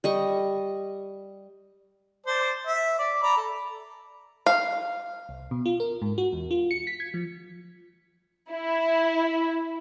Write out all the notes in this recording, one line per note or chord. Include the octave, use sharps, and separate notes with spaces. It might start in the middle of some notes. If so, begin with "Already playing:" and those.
G3 D#5 C#6
C5 D5 A5
E5
D5
D5 A#5 B5
A4
F5
C2
B2
F4
A#4
G#2
F#4
E2
F4
C#7
B6
G#6
F3
E4